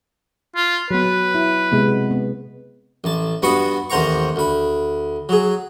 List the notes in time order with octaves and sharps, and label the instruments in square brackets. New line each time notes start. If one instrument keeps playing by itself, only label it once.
[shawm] F4
[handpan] F#3 B3 [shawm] B4
[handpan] E4
C3 G#3 B3
B3
[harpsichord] A1 A5
G2 B3 F#4 B5 C#6 D#6
A1 D#2 C5 F#5 A#5 C#6
D2 B5
F#3 G#4